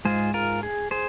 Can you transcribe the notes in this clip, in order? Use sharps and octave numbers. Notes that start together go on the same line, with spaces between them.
G#2 G#3 F4 G#4 C5
F4 A#4
G#4
G#4 C5